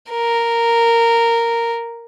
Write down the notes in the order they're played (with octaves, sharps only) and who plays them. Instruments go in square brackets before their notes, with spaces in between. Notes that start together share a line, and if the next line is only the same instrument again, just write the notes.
[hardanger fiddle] A#4